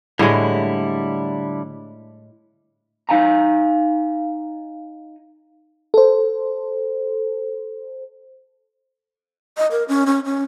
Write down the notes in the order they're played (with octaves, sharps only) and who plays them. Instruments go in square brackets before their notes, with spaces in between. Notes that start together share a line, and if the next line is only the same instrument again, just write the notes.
[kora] A2 G#3 [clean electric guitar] D3 G3 E4
[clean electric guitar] D#4 F5 G#5 A#5
[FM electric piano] A4 C5
[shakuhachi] D#5
A#4
C#4
C#4
C#4